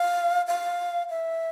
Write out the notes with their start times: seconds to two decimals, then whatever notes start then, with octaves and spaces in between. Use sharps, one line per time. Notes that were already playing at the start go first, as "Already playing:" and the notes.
Already playing: F5
0.47 F5
1.10 E5